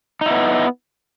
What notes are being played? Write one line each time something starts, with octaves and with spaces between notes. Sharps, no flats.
B3 D#4 E4